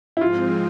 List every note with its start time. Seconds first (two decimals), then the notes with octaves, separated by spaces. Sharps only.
0.17 E4
0.21 G#2 F3 G#3 C4 F4